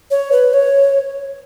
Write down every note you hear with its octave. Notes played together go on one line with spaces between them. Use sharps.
C#5
B4
C#5